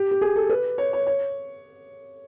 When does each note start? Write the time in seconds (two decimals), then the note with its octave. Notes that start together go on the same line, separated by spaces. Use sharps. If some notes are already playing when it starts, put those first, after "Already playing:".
Already playing: G4
0.11 G4
0.21 G#4
0.36 A4
0.50 B4
0.78 C#5
0.93 C#5
1.07 C#5